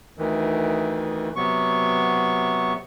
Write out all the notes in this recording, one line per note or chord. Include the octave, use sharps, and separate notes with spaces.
D2 D#3 E3
C3 F#3 B3 C#6